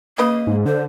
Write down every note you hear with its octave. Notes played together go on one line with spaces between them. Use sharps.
C#3 A#3 B4 D#5
G#2
D3 C5